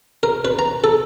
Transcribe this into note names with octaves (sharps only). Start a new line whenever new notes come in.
A#4
B4
A#5
A4